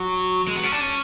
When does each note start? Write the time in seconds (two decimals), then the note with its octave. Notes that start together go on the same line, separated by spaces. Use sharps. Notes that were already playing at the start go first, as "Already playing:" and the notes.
Already playing: F#3
0.48 G#3
0.56 B3
0.63 C#4
0.72 D4
0.80 C#4